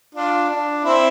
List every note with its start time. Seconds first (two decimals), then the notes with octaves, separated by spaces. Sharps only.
0.15 D4 F4
0.50 D4
0.85 C4 E4